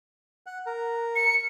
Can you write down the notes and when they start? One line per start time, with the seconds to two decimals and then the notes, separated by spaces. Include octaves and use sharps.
0.46 F#5
0.66 A#4
1.16 C#7